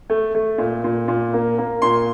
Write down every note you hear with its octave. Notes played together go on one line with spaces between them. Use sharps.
A3
A3
A#2
A#2
A#2
A#3
A#3
A#2 C6